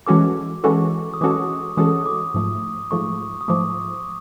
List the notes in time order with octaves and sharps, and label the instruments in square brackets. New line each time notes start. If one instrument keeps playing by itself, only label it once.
[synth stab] E3 G#3 C#4 F#4 A4 [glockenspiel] D6
[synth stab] E3 G#3 C#4 F#4 A4 [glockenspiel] C#6
[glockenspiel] D#6
[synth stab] E3 G#3 C#4 F#4 A4 [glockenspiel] D6
[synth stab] E3 G#3 C#4 F#4 A4 [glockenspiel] D#6
[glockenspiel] D6
[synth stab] G#2 F3 A3
[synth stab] G#2 F3 A3 [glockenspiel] C#6
[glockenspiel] D#6
[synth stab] G#2 F3 A3 [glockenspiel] D6